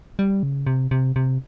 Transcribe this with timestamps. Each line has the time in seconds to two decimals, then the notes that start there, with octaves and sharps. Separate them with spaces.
0.19 G3
0.43 C#3
0.67 C3
0.91 C3
1.16 C3